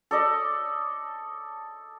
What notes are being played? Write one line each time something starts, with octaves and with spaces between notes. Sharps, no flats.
A4 D5 D#5